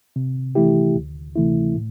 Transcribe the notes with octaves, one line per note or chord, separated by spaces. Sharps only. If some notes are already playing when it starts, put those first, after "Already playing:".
C3
E3 A3 E4 G4
D2
C3 E3 A3 E4
A2